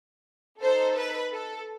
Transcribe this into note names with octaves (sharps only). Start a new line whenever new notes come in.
D#4 A4 C5
B4
A4